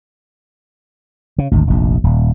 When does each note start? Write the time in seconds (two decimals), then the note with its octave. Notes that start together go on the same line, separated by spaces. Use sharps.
1.38 C#3
1.52 G#1 D2
1.67 F1 A#1
2.04 D#1